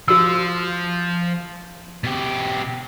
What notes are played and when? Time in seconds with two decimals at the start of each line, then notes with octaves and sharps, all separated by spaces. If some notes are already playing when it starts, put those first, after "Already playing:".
0.08 F3 F#4 E6
2.04 B2 G4